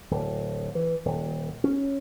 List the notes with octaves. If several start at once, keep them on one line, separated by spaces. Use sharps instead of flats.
D1
E3
D#1
C#4